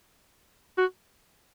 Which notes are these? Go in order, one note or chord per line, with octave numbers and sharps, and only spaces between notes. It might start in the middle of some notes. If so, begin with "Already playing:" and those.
F#4